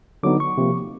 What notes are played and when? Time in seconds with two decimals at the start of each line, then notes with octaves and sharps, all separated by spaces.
0.23 D3 F#3 B3 D#4 D6
0.40 C#6
0.57 C3 F3 A#3